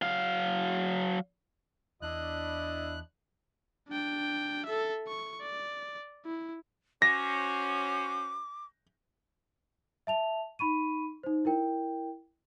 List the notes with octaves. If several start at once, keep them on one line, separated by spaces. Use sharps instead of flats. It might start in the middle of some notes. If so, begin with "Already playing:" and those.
F#3 F5
E2 D4 E4 D#5 F#6
D4 G5
A4 E5
C#6
D5
E4
C#4 F#4 C5 D6 A#6
E5 A5 F7
D#4 B5 C#6 D#7
D#4 C5
E4 A#4 G5